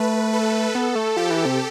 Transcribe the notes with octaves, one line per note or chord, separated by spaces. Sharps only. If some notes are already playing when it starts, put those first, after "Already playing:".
Already playing: A3 B4
A4
B3
A3
F3 G4
E3
C3